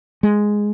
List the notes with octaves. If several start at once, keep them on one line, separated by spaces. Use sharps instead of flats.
G#3